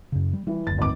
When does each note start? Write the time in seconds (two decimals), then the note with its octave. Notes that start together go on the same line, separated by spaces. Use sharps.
0.12 F#2 C#3
0.33 G3
0.47 E3 G3
0.67 F#1 D2 A6
0.78 G#1 D6